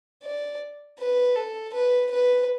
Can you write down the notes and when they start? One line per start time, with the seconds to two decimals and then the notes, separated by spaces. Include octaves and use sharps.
0.23 D5
0.99 B4
1.36 A4
1.74 B4
2.11 B4